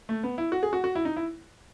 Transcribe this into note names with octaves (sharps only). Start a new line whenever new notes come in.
A3
B3
E4
F#4
G#4
F#4
F#4
E4
D#4
E4